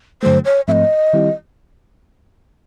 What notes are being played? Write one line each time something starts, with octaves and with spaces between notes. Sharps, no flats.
G2 D3 F#3 A3 C5
C#5
G#2 F3 A3 C4 D#5 E5
D#3 G3 C4 E4 G4